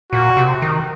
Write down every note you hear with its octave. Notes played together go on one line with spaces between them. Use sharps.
A#2 F#4
C3
D#3